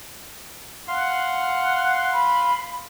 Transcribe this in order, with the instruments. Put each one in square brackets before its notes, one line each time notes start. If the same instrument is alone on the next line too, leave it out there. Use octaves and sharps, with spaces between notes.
[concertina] F5 C6 [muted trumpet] F#5
[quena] B5